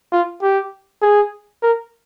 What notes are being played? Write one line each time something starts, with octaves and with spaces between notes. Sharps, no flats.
F4
G4
G#4
A#4